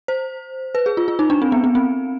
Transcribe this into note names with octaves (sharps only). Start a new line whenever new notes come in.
C5
B4
G#4
F4
F4
D#4
D4
C4
B3
B3
C4